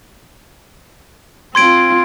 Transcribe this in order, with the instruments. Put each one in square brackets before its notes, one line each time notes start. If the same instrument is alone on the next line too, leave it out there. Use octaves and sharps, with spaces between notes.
[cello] C4 F4 [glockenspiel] C6 G#6 D7